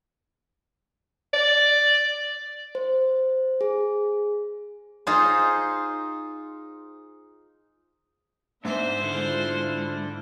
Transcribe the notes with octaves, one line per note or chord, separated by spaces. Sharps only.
D5
C5
G#4
D#4 F4 G#4 C5
G#2 B3 D4 C5 E5
D3 E4 F4